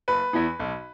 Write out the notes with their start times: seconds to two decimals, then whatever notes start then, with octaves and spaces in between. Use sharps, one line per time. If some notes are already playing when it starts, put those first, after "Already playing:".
0.08 F#1 B4
0.33 E2 E3 B3
0.59 B1